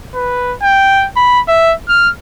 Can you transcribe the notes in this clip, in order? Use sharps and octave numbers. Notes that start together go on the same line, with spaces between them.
B4
G5
B5
E5
F6